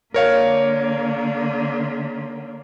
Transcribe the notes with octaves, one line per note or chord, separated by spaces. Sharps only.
D3 A#3 A#4 C#5 F5